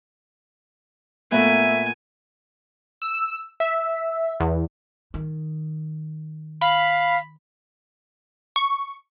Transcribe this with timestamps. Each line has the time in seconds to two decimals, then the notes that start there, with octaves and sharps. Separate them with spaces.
1.32 A#2 A3 B3 E5 G#5
3.02 E6
3.60 E5
4.40 E2
5.14 D#3
6.61 F5 B5
8.56 C#6